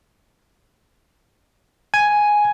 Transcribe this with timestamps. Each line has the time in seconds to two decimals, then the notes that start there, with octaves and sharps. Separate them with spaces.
1.94 G#5